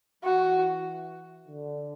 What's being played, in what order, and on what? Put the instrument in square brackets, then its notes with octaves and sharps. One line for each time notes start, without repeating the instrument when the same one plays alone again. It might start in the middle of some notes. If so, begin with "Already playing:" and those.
[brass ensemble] E3 [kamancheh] F#4
[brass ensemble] D3